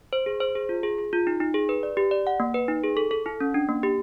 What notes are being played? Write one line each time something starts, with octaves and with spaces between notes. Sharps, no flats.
C5
G#4
C5
G#4
F4
G#4
G#4
F4
D#4
D#4
G#4
B4
D5
G4
D5
F#5
A#3
B4
D#4
G#4
A4
A4
E4
C#4
D4
A#3
G4